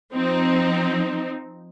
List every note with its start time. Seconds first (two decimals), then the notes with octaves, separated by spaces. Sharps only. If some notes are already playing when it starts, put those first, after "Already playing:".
0.13 F3 C4 D#4